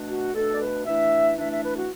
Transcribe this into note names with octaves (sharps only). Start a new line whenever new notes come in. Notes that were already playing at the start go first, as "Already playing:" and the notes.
Already playing: B2 A3 D4
F#4
B2 A3 D4 A4
D5
B4
E3 A3 D4 E5
E3 A3 D4 E5
E5
B4
F#4